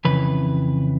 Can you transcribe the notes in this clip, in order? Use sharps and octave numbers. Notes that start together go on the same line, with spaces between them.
F2 C#3 E3 B4